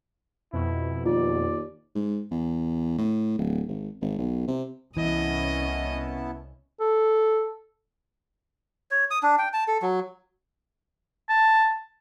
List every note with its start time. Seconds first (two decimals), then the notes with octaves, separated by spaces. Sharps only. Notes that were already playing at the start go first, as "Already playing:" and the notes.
0.53 F2 B2 E4
1.06 D#2 F4 D5
1.95 G#2
2.31 E2
2.98 A2
3.38 D1
3.67 G#1
4.01 G#1
4.18 B1
4.48 C3
4.97 C2 E3 B3 C#4 E4 D#5 A5
6.80 A4
8.91 C#5
9.11 D#6
9.23 D4
9.38 G5
9.53 A5
9.68 A4
9.82 F#3
11.29 A5